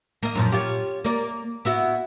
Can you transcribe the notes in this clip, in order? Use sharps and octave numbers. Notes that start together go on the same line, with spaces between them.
A#3 D#5
F#2 A#2 F3
C#4 F4 G4
A#3 D5
B3 E4 F#4